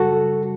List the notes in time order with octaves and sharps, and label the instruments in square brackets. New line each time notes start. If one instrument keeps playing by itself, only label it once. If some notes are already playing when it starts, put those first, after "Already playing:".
Already playing: [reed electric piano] F#2 C#3 G3 F#4 A4